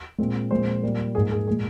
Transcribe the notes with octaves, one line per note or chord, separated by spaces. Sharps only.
A#2 G#3 C4
A#2 F3 G#3 C4 C5
A#2 G3 A#3
G#2 F3 A#3 G#4
G#4
A#2 G#3 G#4